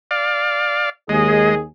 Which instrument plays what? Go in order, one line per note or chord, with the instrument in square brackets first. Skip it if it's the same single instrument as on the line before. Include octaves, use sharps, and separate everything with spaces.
[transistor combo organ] D5 F5
[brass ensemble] D#2 G#4 [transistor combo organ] G#3 D#5